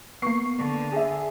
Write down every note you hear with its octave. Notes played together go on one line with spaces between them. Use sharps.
A#3 B3 C#6 C7
D3
G#4 E5